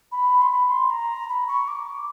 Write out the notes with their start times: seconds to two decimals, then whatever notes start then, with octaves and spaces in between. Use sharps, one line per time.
0.12 B5
0.42 C6
0.51 B5
0.71 C6
0.90 A#5
1.29 B5
1.48 C#6
1.68 D6